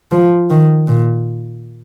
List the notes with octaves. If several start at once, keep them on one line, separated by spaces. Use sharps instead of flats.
F3
D#3
A#2